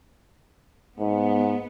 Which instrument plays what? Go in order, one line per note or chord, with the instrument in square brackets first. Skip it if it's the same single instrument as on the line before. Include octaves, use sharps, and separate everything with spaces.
[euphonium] G#2 [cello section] B3